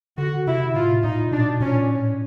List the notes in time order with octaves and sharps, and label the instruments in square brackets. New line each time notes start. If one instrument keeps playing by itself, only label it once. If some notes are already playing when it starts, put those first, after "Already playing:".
[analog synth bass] D3 [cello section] F#4
[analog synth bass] C3 [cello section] E4
[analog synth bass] A2 [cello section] F4
[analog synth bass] A#2 [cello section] D#4
[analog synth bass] B2 [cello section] D4
[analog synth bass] A#2 [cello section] C#4
[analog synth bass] A2